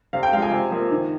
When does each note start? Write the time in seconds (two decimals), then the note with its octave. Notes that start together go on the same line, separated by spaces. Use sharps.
0.13 C3 F5
0.23 G5
0.32 G#3 F5
0.36 F3
0.42 G#5
0.52 C3
0.71 F3 A#3
0.91 D#3